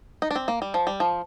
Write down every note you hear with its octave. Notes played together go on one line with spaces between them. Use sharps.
D#4
D4
C4
A#3
G3
F3
G3
F3